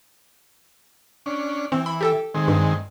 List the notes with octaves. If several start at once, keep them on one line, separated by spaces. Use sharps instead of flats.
C#4 D4
E3 C4
B5
G4 A4 G5
D#3 G#3 C4
G2